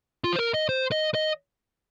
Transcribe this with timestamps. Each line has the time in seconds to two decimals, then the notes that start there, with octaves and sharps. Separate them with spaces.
0.24 F4
0.33 C5
0.39 A#4
0.54 D#5
0.69 C5
0.92 D#5
1.14 D#5